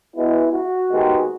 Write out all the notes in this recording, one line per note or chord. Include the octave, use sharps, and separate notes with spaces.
B2 G#3 B3 E4
F#4
D#2 D#3 G#3 B3